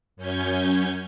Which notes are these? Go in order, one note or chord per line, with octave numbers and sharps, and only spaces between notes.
F#2 C#4 G6 G#6